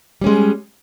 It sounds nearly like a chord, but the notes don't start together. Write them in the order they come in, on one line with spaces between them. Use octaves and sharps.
G3 C#4 G#3